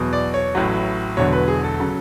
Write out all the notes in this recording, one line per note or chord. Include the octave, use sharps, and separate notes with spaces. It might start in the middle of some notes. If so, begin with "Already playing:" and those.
Already playing: E2 B2 F#3
D5
C#5
A1 A2 F#3
E1 E2 D3 F#3 C#5
B4
G#4
A4
C#3 F#3